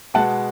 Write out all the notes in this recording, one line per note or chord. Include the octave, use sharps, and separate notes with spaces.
B2 G#3 B3 F#5 A5